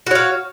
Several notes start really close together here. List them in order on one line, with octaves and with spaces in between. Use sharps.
F#4 C#5 F5